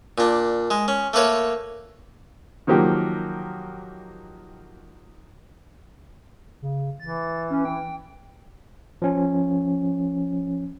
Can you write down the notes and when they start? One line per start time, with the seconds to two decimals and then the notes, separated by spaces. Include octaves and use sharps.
0.18 A#2 D4
0.71 G#3
0.88 C#4
1.13 A3 A#3 B4 C#5
2.67 D#3 F3 F#3 A#3 G4
6.62 C#3
7.00 E3 A6
7.50 C#4
7.65 G5
9.02 F3 C#4